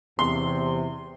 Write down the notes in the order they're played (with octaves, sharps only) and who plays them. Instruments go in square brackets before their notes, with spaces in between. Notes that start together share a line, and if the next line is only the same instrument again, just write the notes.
[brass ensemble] E2 C3 [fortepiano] C6